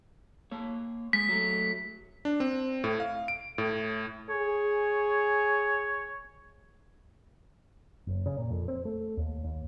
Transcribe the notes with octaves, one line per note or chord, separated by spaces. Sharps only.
A#3 C#5
G#3 B6
F#3 A3
D4
C4
A2
F5
D7
A2
G#4 C#5
F#1
C#3
A#2
F2
C4
A3
D#2
D#2